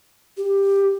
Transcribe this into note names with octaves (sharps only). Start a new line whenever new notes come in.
G4